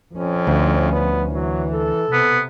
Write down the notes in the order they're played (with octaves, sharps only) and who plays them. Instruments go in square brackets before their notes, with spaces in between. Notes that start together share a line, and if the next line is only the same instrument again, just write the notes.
[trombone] F2 [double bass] F3 C#4
[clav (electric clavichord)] D2
[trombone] B3
[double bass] E3 [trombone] F#3
[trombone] A4
[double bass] C3 [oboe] B3